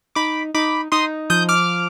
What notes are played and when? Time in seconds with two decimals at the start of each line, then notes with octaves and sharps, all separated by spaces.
0.15 D#4 B5 D6
0.54 D#4 B5 D6
0.92 D#4 C6 D#6
1.30 F3 D#6 G6
1.49 D6 F6